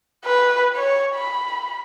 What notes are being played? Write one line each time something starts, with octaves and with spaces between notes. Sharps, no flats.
B4
C#5
B5